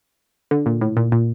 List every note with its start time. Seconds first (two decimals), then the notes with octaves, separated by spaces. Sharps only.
0.51 D3
0.66 A#2
0.81 A2
0.97 A#2
1.12 A#2